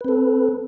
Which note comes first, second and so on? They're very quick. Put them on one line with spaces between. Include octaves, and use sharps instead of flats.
B4 C4 A4